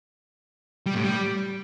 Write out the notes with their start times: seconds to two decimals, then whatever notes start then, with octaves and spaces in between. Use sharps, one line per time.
0.86 G3
0.95 A2
1.03 G3